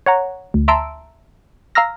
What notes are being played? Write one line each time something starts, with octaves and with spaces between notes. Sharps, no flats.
C#5 F#5 A#5
D2
E5 A5 A#5 C6 E6 D7
F5 A#5 E6 F6 A#6